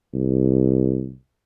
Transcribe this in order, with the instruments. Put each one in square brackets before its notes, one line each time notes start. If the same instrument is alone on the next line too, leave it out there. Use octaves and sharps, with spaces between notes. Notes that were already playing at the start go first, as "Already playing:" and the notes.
[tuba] C2